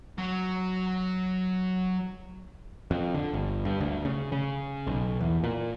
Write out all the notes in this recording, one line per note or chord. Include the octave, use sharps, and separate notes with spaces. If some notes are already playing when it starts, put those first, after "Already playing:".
F#3 F#4
F2
D3
G1
G2
D2
C#3
C#3
B1
E2
A#2